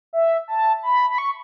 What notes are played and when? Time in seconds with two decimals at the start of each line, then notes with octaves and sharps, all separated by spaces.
0.13 E5
0.48 A5
0.83 B5
1.10 B5
1.18 C#6